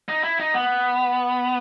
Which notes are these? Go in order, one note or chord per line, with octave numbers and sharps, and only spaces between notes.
D#4
E4
D#4
B3